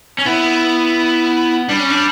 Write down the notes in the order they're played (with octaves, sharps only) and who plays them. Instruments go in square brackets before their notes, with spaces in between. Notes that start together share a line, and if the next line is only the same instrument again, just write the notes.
[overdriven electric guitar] C#4
[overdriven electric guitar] B3 [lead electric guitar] E4
[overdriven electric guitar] G3 [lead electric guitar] D4
[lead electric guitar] C#4
D4